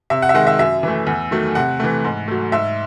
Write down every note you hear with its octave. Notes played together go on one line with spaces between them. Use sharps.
C3 E5
F#5
E5
D#3 G#3 F#5
E5
F#2 E5
E3 A3
E2
D#3 F#3 A3
C3 F#5
E3 A3
G#2
F#3 A3
G#2 E5